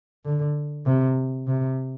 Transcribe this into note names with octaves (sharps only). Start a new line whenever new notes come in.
D3
C3
C3